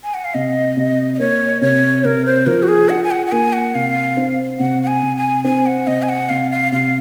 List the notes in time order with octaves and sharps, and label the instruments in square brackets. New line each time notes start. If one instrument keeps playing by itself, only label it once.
[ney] G#5
F#5
F5
[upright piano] C3 [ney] D#5
[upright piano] C3
[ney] D#5
[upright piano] A#3 [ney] C#5
[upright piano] C3 [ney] C#5
[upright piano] C3 [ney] A#4
[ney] C5
[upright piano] F3 [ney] A#4
[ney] F#4
G#4
[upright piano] F4 [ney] F#5
[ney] G#5
F#5
F#5
[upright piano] A#3 [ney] G#5
[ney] F#5
[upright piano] C3 [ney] F5
[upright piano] C4
[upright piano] C3 [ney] F#5
[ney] F#5
G#5
[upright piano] C3
[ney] G#5
[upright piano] C4 [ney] G#5
[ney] F#5
[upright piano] C3 [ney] D#5
[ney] G#5
F#5
[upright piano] C3 [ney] F5
[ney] F5
[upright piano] C3 [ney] F5